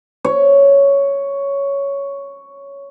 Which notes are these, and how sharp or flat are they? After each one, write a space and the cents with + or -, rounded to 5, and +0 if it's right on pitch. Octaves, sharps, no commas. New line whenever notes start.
C#5 +5